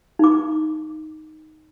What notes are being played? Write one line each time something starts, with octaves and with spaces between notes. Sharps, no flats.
D#4 D6